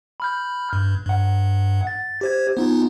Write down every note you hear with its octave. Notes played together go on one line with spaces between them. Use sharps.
B5 F6 G6
G2
G2 F#5
A6
G4 C5 G#6
B3 D#4 F4